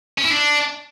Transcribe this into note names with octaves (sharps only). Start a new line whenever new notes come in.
C#4
E4
D4